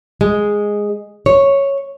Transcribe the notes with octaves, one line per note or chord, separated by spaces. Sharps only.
G#3
C#5